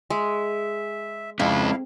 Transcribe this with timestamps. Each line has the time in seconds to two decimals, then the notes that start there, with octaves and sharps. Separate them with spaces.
0.10 G#3 E5
1.40 F2 G#3 C#4 E4 F5